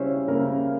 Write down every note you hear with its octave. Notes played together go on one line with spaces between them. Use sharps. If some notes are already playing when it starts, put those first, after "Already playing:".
Already playing: C#3 G3 C#4 E4 C5 C#5
C#3 A#3 A#4